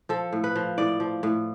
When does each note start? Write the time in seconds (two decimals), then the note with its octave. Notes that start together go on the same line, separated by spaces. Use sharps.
0.09 F3 A4
0.32 A2
0.44 B4
0.56 F3
0.78 A2 D5
1.00 F3
1.23 A2